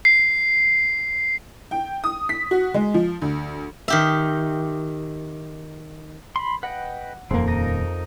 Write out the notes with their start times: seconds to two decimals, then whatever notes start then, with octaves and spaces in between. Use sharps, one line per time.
0.05 C7
1.71 G5
2.04 D#6
2.29 B6
2.51 F#4
2.74 G#3
2.94 F3
3.22 D2
3.88 D#3 G4 E5
6.36 B5 C6
6.63 B4 D#5 F#5 G5
7.31 D#1 F2 A#3 C4
7.48 D#4 A#4 A#6 D#7